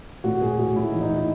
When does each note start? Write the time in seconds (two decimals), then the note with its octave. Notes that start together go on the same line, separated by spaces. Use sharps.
0.24 A2 F#4
0.41 A2 G#4
0.58 A2 F#4
0.75 A2 E4
0.89 D#4
0.93 E3
1.01 D#4
1.09 A2
1.15 E4